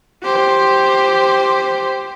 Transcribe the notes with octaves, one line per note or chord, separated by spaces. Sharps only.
G4 C5